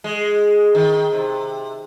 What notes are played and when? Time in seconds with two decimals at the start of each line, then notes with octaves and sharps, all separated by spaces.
0.04 G#3
0.75 D#3
1.12 C3